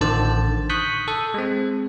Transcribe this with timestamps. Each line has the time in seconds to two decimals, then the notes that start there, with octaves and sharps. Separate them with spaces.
0.01 A1 D3 D#3 C5 A5
0.70 C#6 D#6 F#6 G6 B6
1.08 A4
1.34 G#3 C4